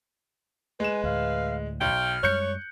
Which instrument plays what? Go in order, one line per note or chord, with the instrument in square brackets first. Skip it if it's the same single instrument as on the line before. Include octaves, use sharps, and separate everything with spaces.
[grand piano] G#3 E7 [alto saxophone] B4 [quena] G#5
[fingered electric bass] D2 A2 [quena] F5
[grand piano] B1 [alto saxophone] G5 [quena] F6
[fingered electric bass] F#2 G3 G#3 [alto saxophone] C#5 [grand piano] F#6 G6 C#7